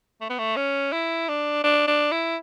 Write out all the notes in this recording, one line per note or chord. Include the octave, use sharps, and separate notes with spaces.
A3
B3
A3
C#4
E4
D4
D4
D4
E4